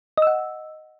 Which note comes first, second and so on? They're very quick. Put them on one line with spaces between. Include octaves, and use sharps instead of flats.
D#5 E6 F#5